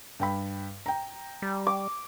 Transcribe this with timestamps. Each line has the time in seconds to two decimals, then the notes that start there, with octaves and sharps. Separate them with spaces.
0.20 G2 G5 B5
0.86 G5 A#5
1.42 G3
1.67 D6